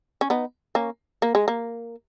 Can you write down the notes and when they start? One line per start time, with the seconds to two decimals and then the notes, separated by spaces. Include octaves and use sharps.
0.21 C#4
0.30 B3 D#4
0.75 A#3 C#4
1.22 A#3
1.35 G#3
1.48 A#3